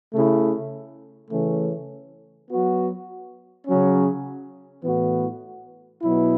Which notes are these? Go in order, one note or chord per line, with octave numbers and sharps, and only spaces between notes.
C#3 A3 E4
C#3 E3 A3 C#4
F#3 B3 F#4
C#3 F#3 C#4
A2 E3 B3 F#4
B2 F#3 B3 E4